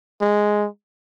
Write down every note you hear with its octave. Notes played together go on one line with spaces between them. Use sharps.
G#3